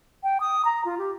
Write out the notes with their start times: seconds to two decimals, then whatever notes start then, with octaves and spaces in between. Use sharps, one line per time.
0.23 G5
0.40 D#6
0.65 A#5
0.85 F4
0.98 G4